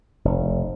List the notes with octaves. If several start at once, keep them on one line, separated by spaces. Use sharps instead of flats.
F1